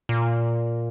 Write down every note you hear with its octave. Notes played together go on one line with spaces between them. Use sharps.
A#2